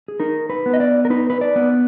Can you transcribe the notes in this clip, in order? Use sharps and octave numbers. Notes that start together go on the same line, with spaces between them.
G#4
D#4 A#4
B4
B3
D#5
D5
A#4
D#4 B4
B4
D5
B3